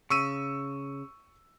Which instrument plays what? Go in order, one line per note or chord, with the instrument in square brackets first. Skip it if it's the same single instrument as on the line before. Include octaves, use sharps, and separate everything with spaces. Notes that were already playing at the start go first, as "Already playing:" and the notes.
[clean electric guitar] C#3 [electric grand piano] C#6 E6 D#7